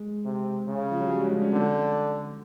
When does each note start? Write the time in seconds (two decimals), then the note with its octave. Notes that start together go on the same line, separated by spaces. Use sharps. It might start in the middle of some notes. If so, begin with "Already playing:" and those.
Already playing: G#3
0.25 C3
0.68 C#3
0.91 F3
1.01 F#3
1.10 G3
1.20 G#3
1.31 D4
1.42 C#4
1.52 D3 C4